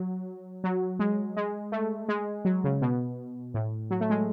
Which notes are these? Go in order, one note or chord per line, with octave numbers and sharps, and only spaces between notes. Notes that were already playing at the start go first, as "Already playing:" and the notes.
Already playing: F#3
F#3
G#3
G#3
A3
G#3
F#3
C#3
B2
A2
F#3
A3
G#3